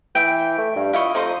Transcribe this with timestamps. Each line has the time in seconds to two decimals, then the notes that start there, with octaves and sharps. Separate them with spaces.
0.15 E3 E5 G5
0.58 A3
0.76 G2
0.93 E4 F4 D#5 C#6
1.15 F2 D#4 C5 D#5